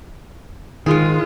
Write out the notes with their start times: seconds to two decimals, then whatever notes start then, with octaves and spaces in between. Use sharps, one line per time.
0.86 G#2 D#3 G#3 F4 G#4